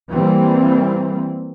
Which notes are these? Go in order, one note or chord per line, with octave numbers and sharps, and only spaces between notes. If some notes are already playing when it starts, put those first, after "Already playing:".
E3 G3 A#3 C4